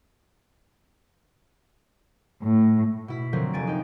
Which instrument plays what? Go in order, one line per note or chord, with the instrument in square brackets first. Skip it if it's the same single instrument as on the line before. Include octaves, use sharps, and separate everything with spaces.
[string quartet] A2
[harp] B2 E4 B6
D3 F3 F#3 A#3 C4 C5
F1 G#5 A6 D7
D#4 G5